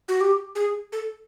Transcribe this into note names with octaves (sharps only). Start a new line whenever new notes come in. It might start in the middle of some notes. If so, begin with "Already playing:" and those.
F#4
G4
G#4
A4